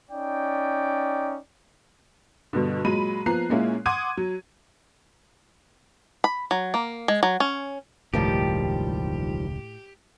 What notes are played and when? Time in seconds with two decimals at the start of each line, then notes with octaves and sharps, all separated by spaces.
0.11 C#4 D#4 D5 G5
2.53 G2 B2 D3
2.84 A#2 F#3 G#3 B5 D#7
3.26 F3 A#3 B3 A#5 F#6 C7
3.49 A#2 G#3 A#3 C#4 E4
3.86 F#5 C6 D6 D#6 G#6 D#7
4.17 F#3
6.24 B5
6.51 F#3
6.74 A#3
7.08 G#3
7.23 F#3
7.40 C#4
8.14 E1 C#2 A2 D#3 F3 G3 G4